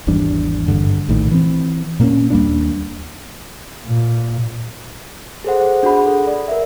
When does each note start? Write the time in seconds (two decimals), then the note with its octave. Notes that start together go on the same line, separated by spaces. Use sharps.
0.07 G#1 E2 G3 D4
0.68 G#1 G2 D3
1.09 A#1 A2 D#3
1.31 E3 C4
2.00 A#2 A#3 B3 C#4
2.30 D#2 G3 A#3 D4
3.86 A#2
5.44 G#4 A4 C5 F#5
5.83 D4 F#4 G#4 F#5 B5
6.06 A4
6.27 D5
6.48 A#4 E5